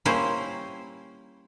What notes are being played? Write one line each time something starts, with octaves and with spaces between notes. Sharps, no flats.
G3 A#3 C#4 E4 C5